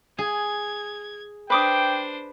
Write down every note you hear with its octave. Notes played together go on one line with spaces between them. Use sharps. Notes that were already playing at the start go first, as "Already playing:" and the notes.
G#4 G#6
D4 B4 C5 G5 D6 D#6